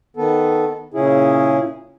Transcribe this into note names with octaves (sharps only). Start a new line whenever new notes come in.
D#3 B3 A4
A#2 C#3 C#4 E4 G#4